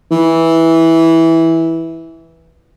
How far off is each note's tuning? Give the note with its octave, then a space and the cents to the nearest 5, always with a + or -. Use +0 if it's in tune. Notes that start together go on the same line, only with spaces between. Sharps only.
E3 -10